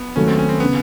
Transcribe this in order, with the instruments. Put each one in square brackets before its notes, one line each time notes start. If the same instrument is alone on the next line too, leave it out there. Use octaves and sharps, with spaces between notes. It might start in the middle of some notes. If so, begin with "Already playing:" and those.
Already playing: [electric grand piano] B3
[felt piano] D#2 D#3 F#3 A3 [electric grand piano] C#4
[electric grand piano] C4
C#4
C4
[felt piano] C#3 [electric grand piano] B3